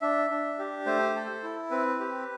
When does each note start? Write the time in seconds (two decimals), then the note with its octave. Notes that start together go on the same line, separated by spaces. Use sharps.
0.01 D4 E5
0.30 D4
0.59 G4
0.86 A3 C5
1.15 A4
1.43 E4
1.71 C4 B4
2.00 G4